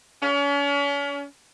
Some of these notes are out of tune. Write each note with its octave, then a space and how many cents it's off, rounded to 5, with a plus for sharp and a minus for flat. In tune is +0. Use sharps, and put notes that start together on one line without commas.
C#4 +40